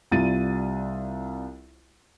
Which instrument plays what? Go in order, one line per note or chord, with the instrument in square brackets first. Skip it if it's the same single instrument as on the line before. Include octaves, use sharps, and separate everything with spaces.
[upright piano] C2 G3 F4 A6 D#7